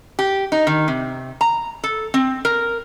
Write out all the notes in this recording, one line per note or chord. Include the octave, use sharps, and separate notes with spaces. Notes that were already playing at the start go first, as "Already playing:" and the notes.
G4
D#4
D#3
C3
A#5
A4
C4
A#4